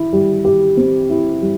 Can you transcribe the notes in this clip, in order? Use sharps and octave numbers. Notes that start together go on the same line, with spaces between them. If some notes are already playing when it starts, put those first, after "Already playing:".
Already playing: E4
G3
G4
C4
E4
G3